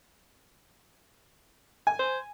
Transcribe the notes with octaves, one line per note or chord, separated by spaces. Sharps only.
G#5
C5